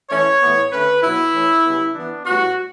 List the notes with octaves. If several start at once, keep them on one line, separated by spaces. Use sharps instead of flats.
E3 A3 C#4 C#5
A2 E3 B3
D3 A3 C#4 B4
B2 F#3 B3 E4
E3 A3 C#4
C#3 G3 B3
E3 B3 D4
A2 G3 B3 F#4